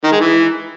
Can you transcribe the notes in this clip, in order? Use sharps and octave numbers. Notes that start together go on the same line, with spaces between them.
D#3
G#3
E3